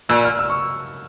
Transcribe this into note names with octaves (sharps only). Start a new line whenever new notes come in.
A#2 E6
F6
E6
C#6